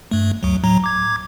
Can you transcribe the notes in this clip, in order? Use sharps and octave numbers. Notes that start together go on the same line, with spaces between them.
G2 A3
D2 F#3
A2 F#3 A#5
D6 G#6